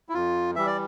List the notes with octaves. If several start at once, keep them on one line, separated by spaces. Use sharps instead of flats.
E4
F2 F4
E3 G3 E5
D5